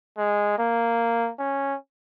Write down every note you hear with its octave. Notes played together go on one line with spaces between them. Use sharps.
G#3
A#3
C#4